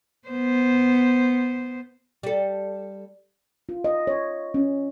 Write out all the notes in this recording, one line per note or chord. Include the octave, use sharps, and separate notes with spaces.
B3 C5
G3 A4
F4
D#5
C#5
C#4